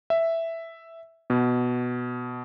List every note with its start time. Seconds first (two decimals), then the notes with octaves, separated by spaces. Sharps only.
0.10 E5
1.30 B2